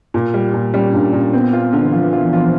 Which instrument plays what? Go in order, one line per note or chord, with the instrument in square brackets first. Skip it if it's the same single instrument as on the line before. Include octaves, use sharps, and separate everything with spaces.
[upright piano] A#2
G3
A#2
[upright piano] G3 [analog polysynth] C#4
[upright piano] A#2 [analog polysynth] D4
[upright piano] A#2 [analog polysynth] C#4
[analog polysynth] B3 [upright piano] C4
[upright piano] F4
D3
[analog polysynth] E3
[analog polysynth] F3 [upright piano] F4
[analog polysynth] E3 [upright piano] F4
[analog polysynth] F3 [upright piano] F4